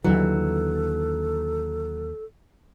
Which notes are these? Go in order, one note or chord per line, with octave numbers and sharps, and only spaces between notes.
D#2 D3 E3 F#3 A4